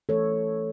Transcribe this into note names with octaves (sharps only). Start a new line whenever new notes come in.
E3 A3 A4 C#5